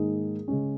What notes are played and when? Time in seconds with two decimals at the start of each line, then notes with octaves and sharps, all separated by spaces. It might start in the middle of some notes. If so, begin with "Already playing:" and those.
Already playing: G#2 D#3 A#3 D#4 G#4
0.48 C#3 G#3 C#4